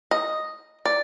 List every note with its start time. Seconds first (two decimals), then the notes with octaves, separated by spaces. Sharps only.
0.11 D#5
0.85 D5